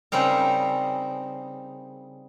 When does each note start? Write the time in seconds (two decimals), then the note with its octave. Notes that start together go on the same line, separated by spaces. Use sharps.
0.12 C#3 G3 C4 D#4 A#4